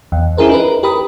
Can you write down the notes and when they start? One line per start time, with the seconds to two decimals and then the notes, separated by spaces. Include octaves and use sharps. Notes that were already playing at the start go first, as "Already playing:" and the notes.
0.12 E2
0.37 C#4 E4 G#4 A#4 C5
0.49 D#4 A#4 B4
0.83 G4 A#4 B5 D#6